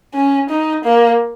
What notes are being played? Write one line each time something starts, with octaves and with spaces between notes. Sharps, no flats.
C#4
D#4
A#3